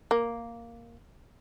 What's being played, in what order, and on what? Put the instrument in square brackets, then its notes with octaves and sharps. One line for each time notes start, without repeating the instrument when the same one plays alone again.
[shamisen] A#3